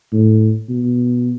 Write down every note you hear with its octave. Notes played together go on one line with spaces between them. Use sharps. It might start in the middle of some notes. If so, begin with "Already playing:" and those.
A2
B2